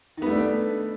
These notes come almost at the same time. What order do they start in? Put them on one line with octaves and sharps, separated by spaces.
D#3 B3 A3 D4